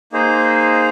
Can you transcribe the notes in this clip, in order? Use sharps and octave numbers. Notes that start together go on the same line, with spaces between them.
A#3 D#4 G#4 C5